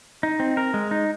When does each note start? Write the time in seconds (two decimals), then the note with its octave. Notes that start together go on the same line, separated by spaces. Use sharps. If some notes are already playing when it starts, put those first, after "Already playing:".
0.23 D#4
0.40 C4
0.57 A#4
0.74 G#3
0.91 D#4